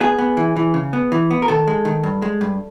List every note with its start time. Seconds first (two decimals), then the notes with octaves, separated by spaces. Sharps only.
0.01 B3 G#4
0.18 B3
0.37 E3
0.56 E3
0.74 C#3
0.93 B3
1.12 E3
1.31 B3
1.42 A#4
1.48 D#3 A4
1.67 G#3
1.85 D#3
2.03 G2
2.22 G#3
2.41 G2